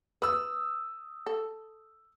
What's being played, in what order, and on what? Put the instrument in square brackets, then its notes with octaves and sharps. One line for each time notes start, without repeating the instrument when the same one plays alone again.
[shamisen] B4 [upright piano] D#6 E6
[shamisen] A4